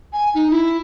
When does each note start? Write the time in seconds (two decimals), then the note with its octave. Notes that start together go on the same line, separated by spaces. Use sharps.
0.13 G#5
0.35 D#4
0.51 E4